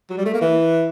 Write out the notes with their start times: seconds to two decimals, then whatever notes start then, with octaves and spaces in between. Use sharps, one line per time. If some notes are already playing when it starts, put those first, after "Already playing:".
0.10 F#3
0.18 G3
0.26 A3
0.34 A#3
0.41 E3